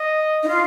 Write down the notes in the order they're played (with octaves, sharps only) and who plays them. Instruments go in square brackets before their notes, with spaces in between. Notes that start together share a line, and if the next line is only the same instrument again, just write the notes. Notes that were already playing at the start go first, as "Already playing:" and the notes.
Already playing: [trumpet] D#5
[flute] D#4
F4